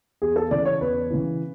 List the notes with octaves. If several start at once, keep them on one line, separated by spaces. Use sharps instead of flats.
E2 G#4
A4
C#3 E3 D5
C#5
E2 B4
C#3 E3